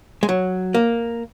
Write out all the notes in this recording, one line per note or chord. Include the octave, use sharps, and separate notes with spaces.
G#3
F#3
A#3